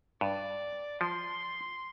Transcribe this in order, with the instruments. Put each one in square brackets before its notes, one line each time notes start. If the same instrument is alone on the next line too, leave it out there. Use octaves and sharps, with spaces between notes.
[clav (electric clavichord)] G2 [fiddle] D5
[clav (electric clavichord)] F3 [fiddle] C6